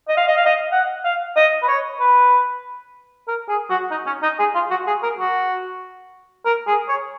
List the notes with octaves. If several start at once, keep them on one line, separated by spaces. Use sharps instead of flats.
D#5
F5
D#5
F5
D#5
F#5
F5
D#5
B4
C#5
B4
A#4
G#4
F#4
D#4
C#4
D#4
G#4
F4
F#4
G#4
A#4
F#4
A#4
G#4
C#5